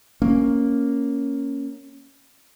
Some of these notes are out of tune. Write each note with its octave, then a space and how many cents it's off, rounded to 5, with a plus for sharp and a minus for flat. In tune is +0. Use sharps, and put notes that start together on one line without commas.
A#3 +0 C#4 +0